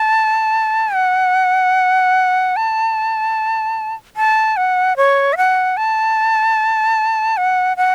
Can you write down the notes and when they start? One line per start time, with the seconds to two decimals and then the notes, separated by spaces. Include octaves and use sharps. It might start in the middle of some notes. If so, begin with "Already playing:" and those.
Already playing: A5
0.95 F#5
2.56 A5
4.17 A5
4.57 F#5
4.97 C#5
5.33 E5
5.37 F#5
5.77 A5
7.37 F#5
7.77 F#5